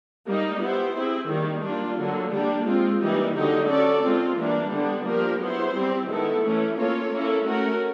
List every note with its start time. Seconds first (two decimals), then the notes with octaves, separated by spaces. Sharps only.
0.26 G3 A#3 D#4
0.60 B3 E4 G4 C5
0.94 C4 E4 G#4
1.28 D#3 G3 A#3
1.62 G3 A#3 D4 F4
1.97 D3 F#3 A#3
2.31 G3 A#3 D4 G4
2.66 G#3 C4 F4
3.00 E3 G3 A#3 D#4 G4
3.34 D3 F#3 A#3 D#4 G4
3.68 C#4 F#4 A4 D5
4.02 G#3 C4 F4
4.37 E3 G3 A#3 D4
4.71 D3 G3 B3 D4
5.05 F3 A#3 D4 G4 A#4
5.39 F#3 B3 E4 G#4 C5
5.74 G3 C4 E4 G4
6.08 D#3 G#3 B3 E4 A4
6.42 E3 A3 C#4 E4
6.77 A#3 C#4 F4 A4 C#5
7.11 A#3 C#4 E4 A4
7.45 A3 C#4 F#4 A#4